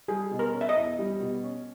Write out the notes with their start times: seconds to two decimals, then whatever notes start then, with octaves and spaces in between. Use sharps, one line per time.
0.08 G3 G#4
0.31 B2
0.39 A#4
0.53 C#4
0.61 E5
0.69 D#5
0.76 E2
0.99 G3
1.21 B2
1.43 C#4